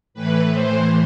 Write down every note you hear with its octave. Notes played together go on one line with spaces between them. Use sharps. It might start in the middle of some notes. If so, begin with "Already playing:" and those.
A2 E3 B4
C5